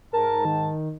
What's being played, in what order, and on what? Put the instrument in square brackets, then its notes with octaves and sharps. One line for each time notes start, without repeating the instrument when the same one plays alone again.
[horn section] G#2 A5 [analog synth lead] A#4
[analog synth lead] D#3